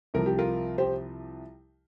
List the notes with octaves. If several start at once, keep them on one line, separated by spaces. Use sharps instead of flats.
C2 C3 F3 A#4
G4
F4 A#4
G4 C5